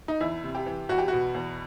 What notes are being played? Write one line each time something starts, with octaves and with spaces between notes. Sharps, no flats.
D#4
E2 E4
C3
G4
E3
E2 F#4
G4
B2 F#4
E2